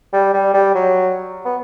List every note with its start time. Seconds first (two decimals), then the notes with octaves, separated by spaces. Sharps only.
0.13 G3
0.34 G3
0.54 G3
0.75 F#3
1.45 B3